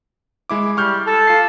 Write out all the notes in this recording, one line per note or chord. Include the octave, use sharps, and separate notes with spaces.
G#3 E4 D6
G3 C#6 F6 G6
A4
F4 C7